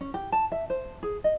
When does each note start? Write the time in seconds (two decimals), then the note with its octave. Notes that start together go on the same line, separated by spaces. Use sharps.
0.01 C#4
0.14 G4
0.32 A5
0.52 E5
0.70 C5
1.03 G#4
1.24 D#5